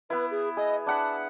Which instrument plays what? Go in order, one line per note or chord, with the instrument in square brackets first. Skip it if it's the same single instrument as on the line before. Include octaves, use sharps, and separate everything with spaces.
[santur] B3 E4 [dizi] B4
[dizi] G#4
[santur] G#4 [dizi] D#5
[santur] D4 F#5 B5 [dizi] A5